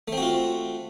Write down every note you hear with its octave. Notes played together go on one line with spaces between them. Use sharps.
A3 C4 F4 F#4